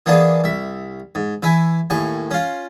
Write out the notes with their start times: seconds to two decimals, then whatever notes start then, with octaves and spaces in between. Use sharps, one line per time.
0.06 E3 A#3 B3 D4 G#4
0.44 C2 E5
1.15 G#2
1.43 E3 E4 E5 G#5
1.90 D#2 A2 G#5 C#6
2.31 C#4 F4